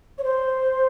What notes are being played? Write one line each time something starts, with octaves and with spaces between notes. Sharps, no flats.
C#5
C5